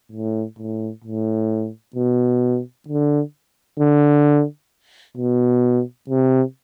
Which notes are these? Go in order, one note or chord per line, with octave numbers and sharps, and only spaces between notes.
A2
A2
A2
B2
D3
D3
B2
C3